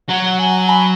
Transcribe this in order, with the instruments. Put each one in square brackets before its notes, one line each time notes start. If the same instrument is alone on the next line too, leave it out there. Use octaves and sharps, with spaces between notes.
[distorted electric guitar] F#3 [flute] F#5
[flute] G#5
B5